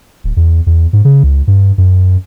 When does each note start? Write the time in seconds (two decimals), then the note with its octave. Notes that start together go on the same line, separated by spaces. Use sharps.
0.24 D1
0.37 E2
0.67 E2
0.93 G#2
1.05 C#3
1.23 C#2
1.47 G2
1.78 F#2